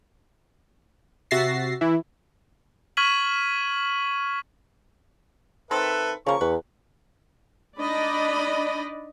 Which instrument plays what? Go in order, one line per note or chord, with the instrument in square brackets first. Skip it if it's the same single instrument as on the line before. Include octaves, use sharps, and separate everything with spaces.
[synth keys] C3 F#4 E5 A6 A#6 C7
E3 E4
[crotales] C#6 F6 G#6 B6 D#7 F#7
[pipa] D#3 C4 [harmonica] A4 B4 E5
[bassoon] C#3 [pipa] F3 A#3 [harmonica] C#6
[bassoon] E2 [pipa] B4
[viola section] D4 D#4 D5 D#5 B5